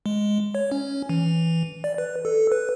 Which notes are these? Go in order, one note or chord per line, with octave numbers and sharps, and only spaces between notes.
G#3
C#5
C#4
E3
D5
B4
A4
B4